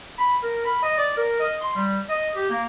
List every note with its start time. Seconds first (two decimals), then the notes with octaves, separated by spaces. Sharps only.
0.18 B5
0.42 A#4
0.64 B5
0.82 D#5
0.97 D5
1.17 A#4
1.40 D#5
1.61 C6
1.75 G3
2.09 D#5
2.35 G4
2.49 A#3